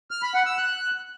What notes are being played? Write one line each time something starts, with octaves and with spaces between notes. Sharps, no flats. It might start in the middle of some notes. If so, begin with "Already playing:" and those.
F6
B5
F#5
E6
F#6